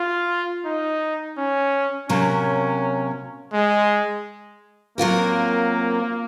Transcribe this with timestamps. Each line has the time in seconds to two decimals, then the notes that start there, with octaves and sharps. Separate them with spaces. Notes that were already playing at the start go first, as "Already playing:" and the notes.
Already playing: F4
0.65 D#4
1.38 C#4
2.09 C3 F#3 A#3 C#4
3.53 G#3
4.98 F#3 A#3 C4 F4 A#4